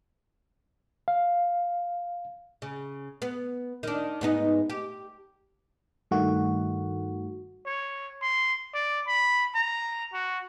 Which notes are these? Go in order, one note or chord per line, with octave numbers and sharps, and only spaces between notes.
F5
C#3
B3
D#3 D4
G#2 B3 D#4
G4
G2 D#3 A3 F#4
C#5
C6
D5
B5
A#5
F#4